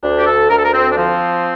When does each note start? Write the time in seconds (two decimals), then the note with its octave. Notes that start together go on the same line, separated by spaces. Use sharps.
0.03 D2 D4
0.19 G4
0.26 A4
0.50 D2 A#4
0.57 A4
0.64 A#4
0.74 C4
0.91 D4
0.97 F3 C4